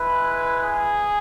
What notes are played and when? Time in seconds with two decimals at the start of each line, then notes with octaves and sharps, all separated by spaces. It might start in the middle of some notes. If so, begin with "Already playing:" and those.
Already playing: G#3 E4 B4
0.64 G#4